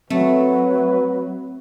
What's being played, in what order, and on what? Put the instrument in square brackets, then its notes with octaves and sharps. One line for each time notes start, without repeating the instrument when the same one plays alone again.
[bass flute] F#3 [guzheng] A3 [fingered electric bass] C4 [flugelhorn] B4